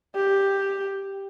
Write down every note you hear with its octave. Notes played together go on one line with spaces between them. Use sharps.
G4